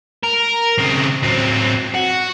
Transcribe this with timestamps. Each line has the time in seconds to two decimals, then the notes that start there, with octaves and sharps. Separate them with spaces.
0.24 A#4
0.78 C#3 C4
1.23 F#3 C4
1.94 F#4